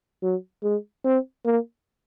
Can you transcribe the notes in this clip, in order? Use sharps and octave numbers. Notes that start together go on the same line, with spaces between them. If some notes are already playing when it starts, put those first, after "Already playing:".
F#3
G#3
C4
A#3